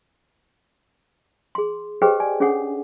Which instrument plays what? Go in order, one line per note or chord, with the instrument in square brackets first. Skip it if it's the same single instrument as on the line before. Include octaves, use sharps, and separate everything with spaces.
[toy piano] G#4 C6
G4 G#4 B4 C5 D#5 G5
D5 G#5
C#4 D4 G#4 A4 C#5 F#5